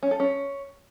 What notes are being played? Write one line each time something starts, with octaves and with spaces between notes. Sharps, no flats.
C#4
A4
C#4